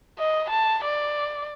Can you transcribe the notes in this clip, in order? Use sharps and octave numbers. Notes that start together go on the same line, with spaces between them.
D#5
A5
D5